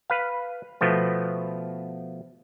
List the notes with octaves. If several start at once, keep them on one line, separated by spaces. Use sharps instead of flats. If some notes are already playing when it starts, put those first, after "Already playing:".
B4 F5
B2 F3 A3 B3